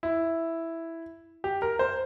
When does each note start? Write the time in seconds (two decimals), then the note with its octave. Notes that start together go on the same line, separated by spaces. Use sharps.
0.03 E4
1.44 G4
1.62 A#4
1.79 C5